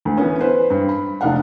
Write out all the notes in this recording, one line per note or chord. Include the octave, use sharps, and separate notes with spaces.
D2
E3 B3 C#4
B4 C5
G2
B5
F1 D4 D5 F5 F#5